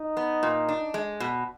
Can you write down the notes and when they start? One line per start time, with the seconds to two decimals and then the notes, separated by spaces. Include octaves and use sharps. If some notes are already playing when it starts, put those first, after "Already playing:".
Already playing: D#4
0.17 B3
0.43 A#2
0.69 D4
0.94 G#3
1.20 B2